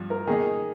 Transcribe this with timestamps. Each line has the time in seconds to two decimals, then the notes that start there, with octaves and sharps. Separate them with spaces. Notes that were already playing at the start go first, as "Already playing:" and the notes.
Already playing: G2 F3
0.10 A#4
0.27 D#3 A#3 D#4 G#4